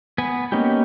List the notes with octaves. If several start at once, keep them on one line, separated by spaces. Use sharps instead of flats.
B3 B4 G#5
A#3 B3 C#4 D#4 G4